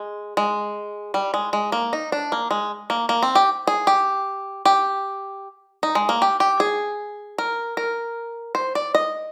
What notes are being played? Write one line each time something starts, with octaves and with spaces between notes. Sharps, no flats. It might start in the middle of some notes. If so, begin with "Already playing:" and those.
Already playing: G#3
G#3
G3
G#3
G#3
A#3
D#4
D4
A#3
G#3
A#3
A#3
C4
G4
G#4
G4
G4
D#4
G#3
A#3
G4
G4
G#4
A#4
A#4
C5
D5
D#5